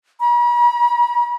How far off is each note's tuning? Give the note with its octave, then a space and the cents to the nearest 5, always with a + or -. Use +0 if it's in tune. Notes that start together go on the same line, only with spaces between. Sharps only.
B5 -45